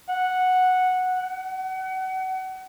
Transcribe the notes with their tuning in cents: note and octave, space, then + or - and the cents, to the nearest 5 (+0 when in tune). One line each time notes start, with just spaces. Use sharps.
F#5 -5
F#5 +30